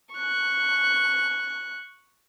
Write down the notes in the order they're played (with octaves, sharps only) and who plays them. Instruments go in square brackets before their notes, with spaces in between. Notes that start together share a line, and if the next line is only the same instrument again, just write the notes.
[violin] C#6 F#6